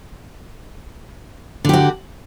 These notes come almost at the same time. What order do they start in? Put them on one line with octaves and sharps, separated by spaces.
D3 G4 F#4